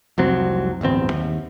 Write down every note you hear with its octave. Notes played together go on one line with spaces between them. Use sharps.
F1 C2 F#3 C4
D1 G1 E2 C4
D#2